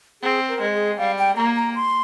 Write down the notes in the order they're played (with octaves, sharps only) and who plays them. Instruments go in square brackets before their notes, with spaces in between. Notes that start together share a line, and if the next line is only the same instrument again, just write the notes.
[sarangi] C4 [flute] G#4
[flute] A#4
[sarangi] G#3
[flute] G#4
[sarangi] G3 [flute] F5
[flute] G5
[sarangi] A#3 [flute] A#5
[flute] A#5
C6